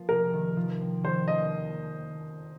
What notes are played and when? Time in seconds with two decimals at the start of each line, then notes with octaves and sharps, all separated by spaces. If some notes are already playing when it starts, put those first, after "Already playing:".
Already playing: F3 A#3
0.09 C3 A#4
0.33 D#3
0.57 F3
0.81 C4
1.03 D#3 C5
1.28 A#3 D#5